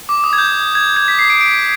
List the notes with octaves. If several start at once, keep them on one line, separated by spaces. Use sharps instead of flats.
D6
D#6
G#6
G6
G#6
G#6
B6
C7
D7
D7